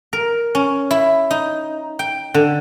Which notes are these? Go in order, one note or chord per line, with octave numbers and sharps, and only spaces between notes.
A#4
C#4
E4
D#4
G5
D3